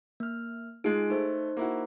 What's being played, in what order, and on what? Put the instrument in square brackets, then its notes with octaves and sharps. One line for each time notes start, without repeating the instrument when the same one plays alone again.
[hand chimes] A#3 F6
[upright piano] G#3 F4 [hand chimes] D#4 G#4 D7
[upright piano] A3 [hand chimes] D#4 C5
[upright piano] A#3 E4 F#4